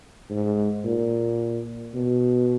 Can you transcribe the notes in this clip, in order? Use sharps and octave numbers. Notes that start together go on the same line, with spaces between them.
G#2
A#2
B2